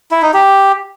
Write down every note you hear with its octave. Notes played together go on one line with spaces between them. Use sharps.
E4
D#4
G4